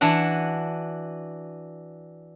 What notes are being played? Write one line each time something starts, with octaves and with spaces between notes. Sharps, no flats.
E3 D4 F#4 F#5